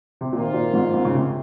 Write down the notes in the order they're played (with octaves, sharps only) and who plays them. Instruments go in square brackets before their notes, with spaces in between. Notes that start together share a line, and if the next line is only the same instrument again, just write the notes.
[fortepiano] C3
[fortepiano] A#2 [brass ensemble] D#3 A#3 F4 C5
[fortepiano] A#2
G#2
G#2
C#3
C3